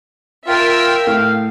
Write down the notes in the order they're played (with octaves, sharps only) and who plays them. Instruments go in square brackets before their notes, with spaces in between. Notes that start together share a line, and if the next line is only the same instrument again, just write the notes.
[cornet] F4 [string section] A#4 E5 G5
[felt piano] A2 [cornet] F5